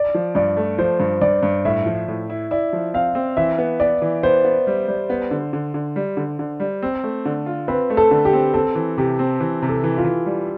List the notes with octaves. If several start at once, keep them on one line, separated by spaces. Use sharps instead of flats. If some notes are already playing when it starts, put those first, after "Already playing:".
Already playing: D5
F3
G2 D5
A3
F3 C5
G2
G2 D5
G2
A2 E5
F3
A2
E4
E4 D5
F3
C4 F5
C4
E3 E5
B3
B3 D5
E3
B3 C5
B3
G3
G3
B3
D3
D3
D3
G3
D3
D3
G3
C4
A3
D3
F4
C4 B4
A3
A4
D3
G4
C4
C4 A4
E3
C3 G4
C4
E3
C3
A4
E3
F4
E3
G3